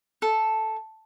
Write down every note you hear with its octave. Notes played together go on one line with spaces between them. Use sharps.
A4